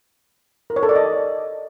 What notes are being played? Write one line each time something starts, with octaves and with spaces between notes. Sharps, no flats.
A#4
C#5
A4
D5
D#5